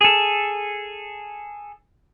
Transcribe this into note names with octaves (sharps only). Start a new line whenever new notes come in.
G#4 A4